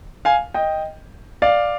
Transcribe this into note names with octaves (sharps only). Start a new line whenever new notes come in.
F5 G#5
D#5 G5
D5 F5